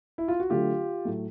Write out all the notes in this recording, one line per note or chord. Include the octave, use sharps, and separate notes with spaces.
E4
F4
F#4
D3 F#3 A3 F4 G4
A2 F#3 A3